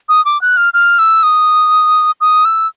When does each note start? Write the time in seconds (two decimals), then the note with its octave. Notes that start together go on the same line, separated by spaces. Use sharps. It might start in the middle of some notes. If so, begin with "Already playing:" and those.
0.09 D#6
0.25 D6
0.41 F#6
0.57 F6
0.74 F6
0.99 E6
1.23 D#6
2.21 D#6
2.45 E6